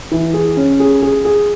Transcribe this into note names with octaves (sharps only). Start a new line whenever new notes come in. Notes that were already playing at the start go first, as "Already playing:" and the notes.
E3
G#4
C#4
G#4
G#4
G#4